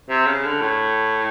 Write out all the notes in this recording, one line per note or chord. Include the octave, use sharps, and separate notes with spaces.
C3
C#3
D3
A2